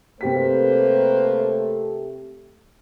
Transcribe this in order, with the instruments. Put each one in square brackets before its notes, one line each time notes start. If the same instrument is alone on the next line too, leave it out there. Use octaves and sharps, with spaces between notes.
[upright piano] C3 G4 B6 [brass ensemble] A3 [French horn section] A#3 B4 C5